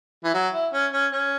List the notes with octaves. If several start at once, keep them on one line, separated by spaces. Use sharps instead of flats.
E3
F#3
E4
C#4
C#4
C#4